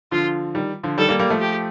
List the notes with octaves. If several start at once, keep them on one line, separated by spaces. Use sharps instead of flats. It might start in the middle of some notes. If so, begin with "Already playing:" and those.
D3 F3 F4
D#3 G3
D3 F3
D#3 G3 A4
G3 A#3
G3 A#3
F3 A3
G4